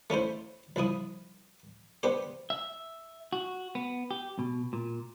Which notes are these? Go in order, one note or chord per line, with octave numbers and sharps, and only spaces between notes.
A3 C#4 E4 C5
C2 F3 E4 D#6
B3 D4 G4 C5
E5
F#4
B3
G4
B2
A#2